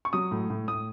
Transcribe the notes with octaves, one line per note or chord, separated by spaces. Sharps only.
C#6
F#3 D#6
A2
A2
A2 D#6